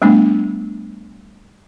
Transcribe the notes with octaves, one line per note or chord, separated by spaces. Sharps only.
G3 A3 B3 D4